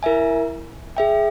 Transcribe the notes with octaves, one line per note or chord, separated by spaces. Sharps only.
E4 A#4 E5 G#5
G#4 E5 G5